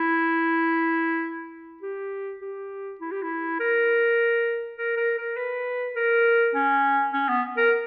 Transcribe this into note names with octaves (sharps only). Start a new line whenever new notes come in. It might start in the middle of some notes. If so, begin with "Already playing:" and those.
Already playing: E4
G4
G4
E4
G4
E4
A#4
A#4
A#4
A#4
B4
A#4
C#4
C#4
B3
A#4